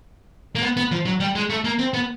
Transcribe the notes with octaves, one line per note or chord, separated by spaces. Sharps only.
A#3
B3
B3
F3
F#3
G3
G#3
A3
A#3
C4
B3